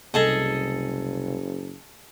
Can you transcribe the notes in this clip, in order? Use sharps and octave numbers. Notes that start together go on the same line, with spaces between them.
F#1 C2 G#4 A4 D#5